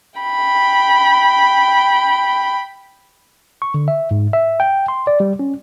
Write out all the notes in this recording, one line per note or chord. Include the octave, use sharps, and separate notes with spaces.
G5 B5
C#6
D3
E5
G#2
E5
G5
C6
D5
G3
C#4